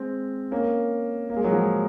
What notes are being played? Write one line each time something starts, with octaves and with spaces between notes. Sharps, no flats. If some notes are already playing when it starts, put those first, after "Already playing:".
Already playing: G#3 C4
A#3 C#4
A#3
G#3
F#3
F3 G#3